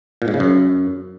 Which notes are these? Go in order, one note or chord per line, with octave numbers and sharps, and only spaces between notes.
A#2
G#2
C#3
F#2